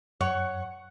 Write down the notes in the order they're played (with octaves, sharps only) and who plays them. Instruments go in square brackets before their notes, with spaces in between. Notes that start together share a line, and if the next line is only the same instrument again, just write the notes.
[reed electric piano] F#2 [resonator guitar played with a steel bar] C#5 [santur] F#5